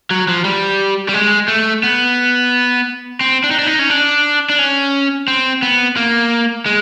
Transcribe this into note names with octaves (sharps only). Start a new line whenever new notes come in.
F#3
F3
G3
G3
G#3
A3
B3
C4
D4
D#4
D4
D#4
C#4
D4
D4
C#4
C4
B3
A#3
G#3